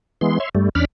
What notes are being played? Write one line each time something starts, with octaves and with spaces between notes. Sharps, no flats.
E3 G#3 B3 C6
C#5 E5 C6
G2 G3 A3
E2 C#4 D4 B5 F6